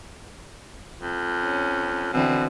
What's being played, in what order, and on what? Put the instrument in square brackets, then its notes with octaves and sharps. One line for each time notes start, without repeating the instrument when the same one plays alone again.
[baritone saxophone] F2
[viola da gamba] C#4
[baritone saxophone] B2 [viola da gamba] D3 E3 C4